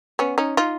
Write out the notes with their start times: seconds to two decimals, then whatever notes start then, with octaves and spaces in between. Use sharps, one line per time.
0.19 B3 C#4
0.38 C#4 D#4
0.57 D#4 F4